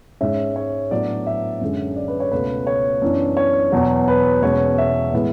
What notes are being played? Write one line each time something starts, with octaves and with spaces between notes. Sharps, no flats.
G#2 G#3 C#4 E5
C#5
A2 F#3 B3 D4 D5
E5
F#2 D3 G#3 C#4
D5
B4
C#5
C#2 B2 A3 B4
C#5
F#2 E3 B3 D4
C#5
E2 B2 F#3
B4
E2 B2 G#3 C#4 C#5
E5
A2 E3 G#3 B3